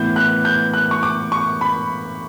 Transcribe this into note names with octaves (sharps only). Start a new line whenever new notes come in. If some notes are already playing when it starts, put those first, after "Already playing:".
Already playing: A2 E3 B3 G6
F#6
G6
F#6
C#6
D6
C#6
B5